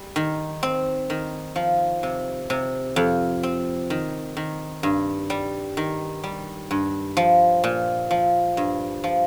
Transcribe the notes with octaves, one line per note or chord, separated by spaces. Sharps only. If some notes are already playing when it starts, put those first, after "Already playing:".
Already playing: G3
D#3
C4
D#3
F3
C3
C3
F2
C4
D#3
D#3
G2
G3
D#3
G3
G2
F3
A#2
F3
G2
F3